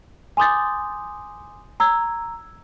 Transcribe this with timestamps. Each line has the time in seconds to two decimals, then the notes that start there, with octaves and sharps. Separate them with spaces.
0.37 G#5 C6 D6 D#6 G6 A6
1.80 A#5 E6 G#6